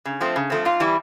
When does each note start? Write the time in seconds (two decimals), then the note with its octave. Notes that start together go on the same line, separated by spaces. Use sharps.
0.05 C#3
0.21 F3 A3 C4
0.36 C#3
0.50 F3 A3 C4
0.65 G#2 F4
0.80 E3 G3 E4